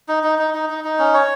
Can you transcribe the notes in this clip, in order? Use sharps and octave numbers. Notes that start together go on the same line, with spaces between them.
D#4
D#4
D#4
D#4
D#4
D#4
C#4
C#5